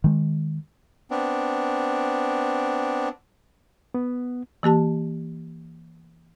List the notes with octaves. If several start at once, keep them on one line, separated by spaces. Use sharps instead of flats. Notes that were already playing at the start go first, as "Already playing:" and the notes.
D#3 G#3
B3 C4 D4
B3
E3 A#3 G4 A5